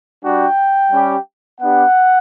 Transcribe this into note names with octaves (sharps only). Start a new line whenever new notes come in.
G3 D4 F#4 G5
G3 C#4 G4
B3 D4 G4 F#5